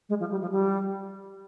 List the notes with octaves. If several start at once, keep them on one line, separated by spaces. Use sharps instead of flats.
G#3
F3
G3
F3
G3